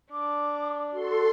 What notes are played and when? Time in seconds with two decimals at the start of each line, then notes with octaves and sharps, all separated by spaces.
0.12 D4 D6
0.93 F#4 A4 C6